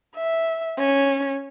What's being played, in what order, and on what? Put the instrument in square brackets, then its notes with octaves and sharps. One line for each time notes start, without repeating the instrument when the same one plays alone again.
[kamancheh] E5
C#4